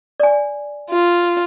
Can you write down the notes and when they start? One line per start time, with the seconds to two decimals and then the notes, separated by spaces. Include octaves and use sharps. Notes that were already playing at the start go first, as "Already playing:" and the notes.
0.20 D5 G#5
0.90 F4